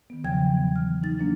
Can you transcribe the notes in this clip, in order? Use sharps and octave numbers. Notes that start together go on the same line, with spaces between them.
D#3 B3
E2 C#3 F3 F#3 G5 G#6
E3 B3
F6
D#4 A6
F#3 A#3 D4